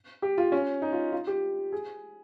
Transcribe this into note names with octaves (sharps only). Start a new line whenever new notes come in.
G4
F4
C#4
D#4
F4
F4
G4
G#4